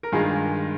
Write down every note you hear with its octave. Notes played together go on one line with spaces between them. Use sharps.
A#4
G2 D#3 G#3 F4 G#4